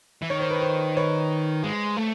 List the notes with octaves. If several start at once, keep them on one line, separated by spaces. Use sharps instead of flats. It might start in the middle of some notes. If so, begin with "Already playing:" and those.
E3
D#3 C#5
C5
B4
C5
B4 C#5
G#3
A3